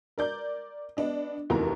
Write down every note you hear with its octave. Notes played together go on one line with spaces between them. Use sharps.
A#4 D5 G6
B3 D4 D#5
F1 D#2 E3 F#4 A#4 A#5